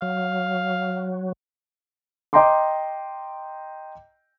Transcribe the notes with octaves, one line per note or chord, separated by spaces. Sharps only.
F#3 F5
D#5 G5 A#5 C6 D6